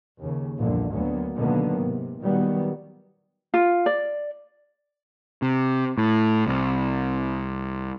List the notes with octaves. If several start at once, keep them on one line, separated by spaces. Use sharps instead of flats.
D#2 C#3
A#1 E2 G2 A#2 D3
D2 D3 F#3 A#3 B3
B2 D3 D#3 F#3 A#3 B3
G#2 C3
A#2 D#3 F#3 G3 B3
F4
D5
C3
A2
C2